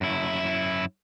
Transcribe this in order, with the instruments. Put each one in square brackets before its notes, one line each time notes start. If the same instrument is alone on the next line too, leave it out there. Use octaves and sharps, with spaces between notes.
[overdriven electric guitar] F#2 E4